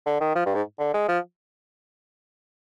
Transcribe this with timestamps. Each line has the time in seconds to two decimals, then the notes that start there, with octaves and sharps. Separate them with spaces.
0.06 D3
0.21 D#3
0.35 F3
0.46 G2
0.55 G#2
0.79 D3
0.94 G#3
1.08 F3